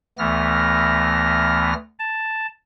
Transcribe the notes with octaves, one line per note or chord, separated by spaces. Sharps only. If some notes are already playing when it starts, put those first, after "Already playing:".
D2 E3 A3 B3 F6 A#6
A5